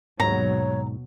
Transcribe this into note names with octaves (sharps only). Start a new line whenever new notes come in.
D#2 G#2 B2 F#3 C#5 A#5